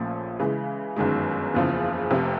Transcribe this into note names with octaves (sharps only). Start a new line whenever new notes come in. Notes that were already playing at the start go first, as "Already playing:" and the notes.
Already playing: A#1 A#2 F3 A3 C#4
C#3 E3 G#3
G1 F#2 D#3 G#3
F#1 E2 C#3 F3
F1 F2 C3